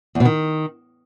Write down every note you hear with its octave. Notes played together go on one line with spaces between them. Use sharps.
E2
B2
D#3